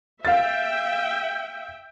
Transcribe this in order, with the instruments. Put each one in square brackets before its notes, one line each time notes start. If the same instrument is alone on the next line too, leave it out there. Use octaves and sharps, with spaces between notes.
[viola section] E5 G5 [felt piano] F5 A6